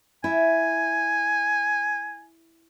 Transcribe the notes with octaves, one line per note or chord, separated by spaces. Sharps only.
E4 G#5